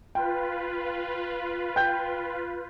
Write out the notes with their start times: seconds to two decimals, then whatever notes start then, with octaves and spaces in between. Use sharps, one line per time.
0.15 F4 B4 G5
1.76 G5 G6